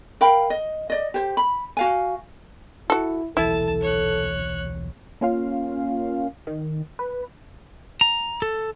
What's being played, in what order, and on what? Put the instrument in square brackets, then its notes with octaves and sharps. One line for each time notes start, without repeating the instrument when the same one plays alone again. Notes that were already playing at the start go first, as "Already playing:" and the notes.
[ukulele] A#4 F5 G5 B5
D#5
D5 D#5
G4 C5
B5
F#4 F5 G#5
[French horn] E4 [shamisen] F#4 A4
[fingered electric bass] D#1 B1 E3 [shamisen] E4 [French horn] A4 [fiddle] A5
[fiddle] C#5 F#6
[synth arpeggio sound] A#3 C#4 F4 F5
D#3
B4
[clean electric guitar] A#5
A4